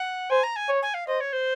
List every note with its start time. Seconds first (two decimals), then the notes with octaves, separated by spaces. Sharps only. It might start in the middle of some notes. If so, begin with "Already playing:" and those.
Already playing: F#5
0.30 C5 G#5
0.43 A#5
0.56 G#5
0.69 C#5
0.82 G#5
0.94 F5
1.07 C5 D#5
1.21 C#5
1.33 C5